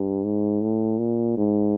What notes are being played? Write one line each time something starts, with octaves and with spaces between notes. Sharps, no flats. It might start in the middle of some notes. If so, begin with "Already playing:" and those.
Already playing: G2
G#2
A2
A#2
G#2